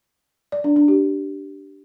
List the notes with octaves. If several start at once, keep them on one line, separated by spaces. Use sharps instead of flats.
D5
D4
D4
G4